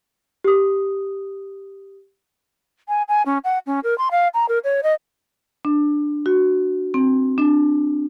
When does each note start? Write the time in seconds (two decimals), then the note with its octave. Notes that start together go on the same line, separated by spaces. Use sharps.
0.44 G4 D#6
2.88 G#5
3.08 G#5
3.26 C#4
3.44 F#5
3.66 C#4
3.83 A#4
3.98 C6
4.11 F5
4.34 A#5
4.48 A#4
4.64 C#5
4.83 D#5
5.65 D4
6.26 F#4
6.94 C4
7.38 D4